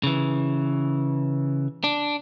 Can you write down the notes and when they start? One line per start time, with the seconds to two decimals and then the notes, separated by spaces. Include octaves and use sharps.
0.03 C#3 E3
1.84 D4